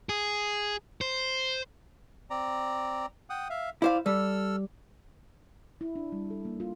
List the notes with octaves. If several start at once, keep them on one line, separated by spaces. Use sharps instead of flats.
G#4
C5
C4 D5 A#5
F#5 G5 D#6
E5 F5
E4 C5 D5 F5
G3 A4 E6 F6
E4
D4
G3
A4
A#3
F4